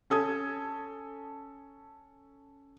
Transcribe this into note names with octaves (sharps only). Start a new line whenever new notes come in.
C#4 A4 D#6 G#6